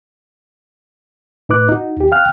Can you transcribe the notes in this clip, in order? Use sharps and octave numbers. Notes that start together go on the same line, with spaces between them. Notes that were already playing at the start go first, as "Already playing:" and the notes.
A2 D#4 B4 D6 F#6
D#4 F#4
D#2 G4
F5 G5 F6 F#6